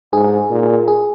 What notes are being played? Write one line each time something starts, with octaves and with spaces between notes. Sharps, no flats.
G#2 G#4
A#2
G#4